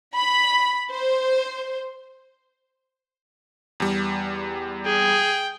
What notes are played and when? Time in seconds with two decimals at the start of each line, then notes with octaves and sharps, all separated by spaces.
0.15 B5
0.90 C5
3.80 E2 G3
4.86 G#4 G5